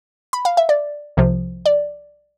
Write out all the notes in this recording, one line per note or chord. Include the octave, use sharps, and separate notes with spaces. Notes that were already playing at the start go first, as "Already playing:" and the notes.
B5
F5
E5
D5
C2 C3 F3
D5